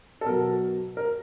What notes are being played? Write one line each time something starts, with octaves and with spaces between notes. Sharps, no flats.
A4
B2 F#3 A#4
A#4